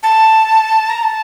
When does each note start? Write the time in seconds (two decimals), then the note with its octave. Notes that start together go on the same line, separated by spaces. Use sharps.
0.03 A5
0.90 A#5
1.03 A5